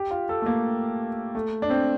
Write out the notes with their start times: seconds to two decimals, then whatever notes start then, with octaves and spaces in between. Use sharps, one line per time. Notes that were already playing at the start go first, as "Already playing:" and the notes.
Already playing: G4
0.11 F4
0.29 A4
0.42 A3
0.46 A#3
1.35 A3
1.62 D4
1.70 C4